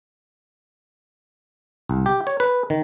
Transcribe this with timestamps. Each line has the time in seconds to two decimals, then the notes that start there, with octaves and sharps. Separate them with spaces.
1.89 C2
2.06 G4
2.27 C#5
2.40 B4
2.70 D#3